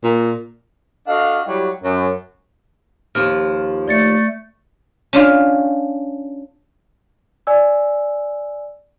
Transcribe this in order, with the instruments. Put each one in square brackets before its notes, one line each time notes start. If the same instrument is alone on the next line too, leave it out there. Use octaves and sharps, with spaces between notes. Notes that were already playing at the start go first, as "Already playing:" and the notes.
[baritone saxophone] A#2
[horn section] D4 F#4 A4 D#5 F5
F#3 G3 E4 F#4 G4
F#2
[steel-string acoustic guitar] D#2 F3 [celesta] F6
[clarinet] A3 [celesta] D5 A6 C#7
[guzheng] C#4 D4 F4
[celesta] D5 G#5 E6